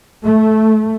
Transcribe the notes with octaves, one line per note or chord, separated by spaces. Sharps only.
A3